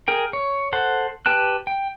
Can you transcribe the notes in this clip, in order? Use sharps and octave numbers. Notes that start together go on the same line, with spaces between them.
G#4 A#4 G5
C#5
A4 C5 F#5
G4 B4 G5 A5 F#6
G5